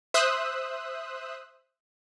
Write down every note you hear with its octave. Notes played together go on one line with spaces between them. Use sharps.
C5 E5 D#6 E6 F#6